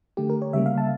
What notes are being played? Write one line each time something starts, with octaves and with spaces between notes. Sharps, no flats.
D3 A3 G4
A#4
C#5
C#3 G3 A#3 E5
F5
A5